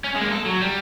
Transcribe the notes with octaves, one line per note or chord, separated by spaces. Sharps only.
C#4
G#3 A#3
A4
F#3
G3